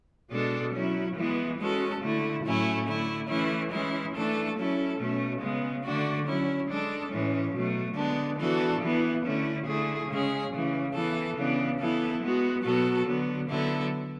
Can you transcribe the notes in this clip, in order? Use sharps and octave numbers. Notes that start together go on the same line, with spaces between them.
B2 G#3 D4 A4
F#3 C#4 E4
E3 G#3 B3 E4
G#3 C#4 F#4 A4
D3 A3 E4
A2 F#3 A3 C#4 E4
D3 A3 E4
E3 A3 C#4 E4
E3 G#3 C#4 E4
E3 A3 D4 A4
F#3 C#4 E4 A4
B2 A3 C#4
C#3 G#3 B3
D3 A3 D4 F#4
F#3 C#4 E4
G#3 D4 A4
A2 E3 G#3 C#4
B2 F#3 A3
D3 G#3 B3 D4
E3 B3 D4 F#4 A4
E3 B3 E4
D3 A3 C#4 E4
D3 A3 E4 G#4
C#3 G#3 C#4 G#4
C#3 E3 A3 C#4
E3 B3 E4 A4
C#3 E3 B3 D4
E3 B3 E4 A4
G#3 B3 F#4
B2 F#3 B3 F#4 A4
D3 F#3 B3
D3 F#3 B3 E4 A4